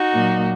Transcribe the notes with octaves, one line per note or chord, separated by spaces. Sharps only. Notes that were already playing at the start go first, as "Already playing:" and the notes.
Already playing: D#4 F#4
A#2 F#3 A#3